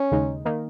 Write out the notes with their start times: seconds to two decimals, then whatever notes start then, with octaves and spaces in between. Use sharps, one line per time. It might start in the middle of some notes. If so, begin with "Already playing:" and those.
Already playing: C#4
0.11 D#2 C#3 G#3 D#4
0.45 D#3 A#3 D#4